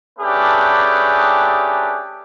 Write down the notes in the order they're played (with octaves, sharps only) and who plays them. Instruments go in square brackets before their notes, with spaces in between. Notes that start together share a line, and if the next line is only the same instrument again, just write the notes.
[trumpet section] A3 C#4 D4 G4 G#4 B4